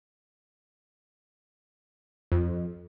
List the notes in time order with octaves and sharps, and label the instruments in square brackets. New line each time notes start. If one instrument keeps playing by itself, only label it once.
[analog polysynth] F2